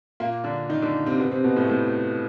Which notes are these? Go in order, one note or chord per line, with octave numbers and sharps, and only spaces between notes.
A#2 A#3
D3 D4
D#3 D#4
D3 D4
C3 C4
B2 B3
C3 C4
B2 B3
A2 A3
A2 A3